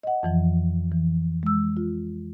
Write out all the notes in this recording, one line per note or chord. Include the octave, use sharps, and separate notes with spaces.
D#5 F#5
F2 E3 F3
E3
G#3 E6
F4